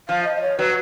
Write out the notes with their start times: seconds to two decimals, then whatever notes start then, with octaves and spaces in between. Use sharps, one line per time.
0.08 F3 F5
0.24 D#5
0.36 D#5
0.41 C#5
0.58 F#3 B4